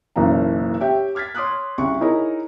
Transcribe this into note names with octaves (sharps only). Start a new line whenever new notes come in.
F#1 B1 F#2 E3 A#3 A#5
G4 C#5 E5 G5
D6 F6 G#6 A6 B6
C#5 C6 D6 D#6 F6 F#6
C2 C#3 C#6
D#4 E4 G#4 A#4 C#5 A#5